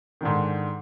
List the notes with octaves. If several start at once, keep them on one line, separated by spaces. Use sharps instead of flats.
G#2 D3 D#3